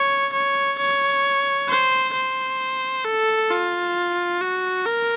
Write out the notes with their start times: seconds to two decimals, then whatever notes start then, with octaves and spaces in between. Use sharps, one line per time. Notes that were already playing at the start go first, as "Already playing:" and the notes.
Already playing: C#5
0.33 C#5
0.79 C#5
1.69 C5
2.14 C5
3.05 A4
3.50 F4
4.41 F#4
4.86 A#4